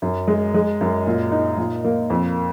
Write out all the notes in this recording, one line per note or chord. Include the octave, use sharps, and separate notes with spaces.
F#2
G#3
G#3
F#2
A#2
D#4
A#2
A#3
F2